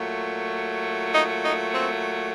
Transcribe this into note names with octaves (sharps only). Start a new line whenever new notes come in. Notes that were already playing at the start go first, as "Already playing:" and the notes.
Already playing: A#2 F#3 A3
D#4
D#4
C4